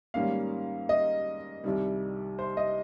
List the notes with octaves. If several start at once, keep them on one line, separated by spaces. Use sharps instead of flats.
G#2 D#3 G3 A#3 C#4 F5
D#5
C2 C3 D#3 G3
C5
D#5